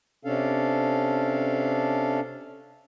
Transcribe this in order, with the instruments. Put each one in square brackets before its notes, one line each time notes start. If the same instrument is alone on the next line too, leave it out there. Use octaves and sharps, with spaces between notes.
[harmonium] C3 C#4 D4 A4 F5